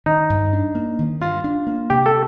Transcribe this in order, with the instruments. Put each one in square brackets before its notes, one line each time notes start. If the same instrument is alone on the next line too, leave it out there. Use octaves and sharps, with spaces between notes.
[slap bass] D#3 [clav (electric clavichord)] D#4
[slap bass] G2
D4
A#3
D#3
[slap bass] G2 [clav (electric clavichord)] F4
[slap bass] D4
A#3
[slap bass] C3 [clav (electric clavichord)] G4
[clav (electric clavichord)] A4